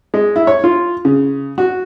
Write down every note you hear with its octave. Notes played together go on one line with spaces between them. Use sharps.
G#3
E4
C#5
F4
C#3
F#4